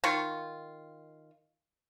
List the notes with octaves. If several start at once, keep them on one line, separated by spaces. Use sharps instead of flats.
D#3 F4 C#6